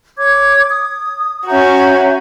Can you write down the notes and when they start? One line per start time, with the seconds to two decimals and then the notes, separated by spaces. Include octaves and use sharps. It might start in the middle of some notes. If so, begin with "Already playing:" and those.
0.18 C#5 D6 G#6
0.70 D#6
1.47 C#4 F#4 E5 A#5 G6